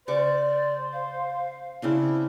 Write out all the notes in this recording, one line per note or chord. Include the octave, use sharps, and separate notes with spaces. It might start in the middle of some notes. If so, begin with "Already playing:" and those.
C#3 C5 D5 C#6 D6
F5
C#3 C4 D4 E4